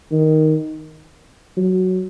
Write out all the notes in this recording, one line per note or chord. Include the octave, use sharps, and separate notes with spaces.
D#3
F#3